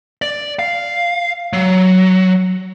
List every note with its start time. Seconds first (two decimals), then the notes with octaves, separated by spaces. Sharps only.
0.22 D5
0.59 F5
1.53 F#3